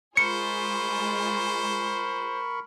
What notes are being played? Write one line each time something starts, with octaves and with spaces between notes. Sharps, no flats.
G#3 F4 G#4 A#4 C5 B5 C#6 C#7